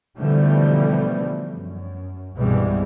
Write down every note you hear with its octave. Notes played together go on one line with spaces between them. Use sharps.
B2 D3 E3 F3 G3 A3
F#2
C2 G2 B2 E3 G3 G#3